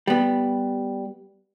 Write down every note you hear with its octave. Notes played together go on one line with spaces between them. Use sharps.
G3 B3